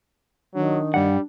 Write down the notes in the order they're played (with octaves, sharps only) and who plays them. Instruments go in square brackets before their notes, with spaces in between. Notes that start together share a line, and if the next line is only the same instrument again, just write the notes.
[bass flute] D#3 [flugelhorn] F#3 [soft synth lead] D4
[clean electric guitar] G2 F#5 [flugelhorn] G3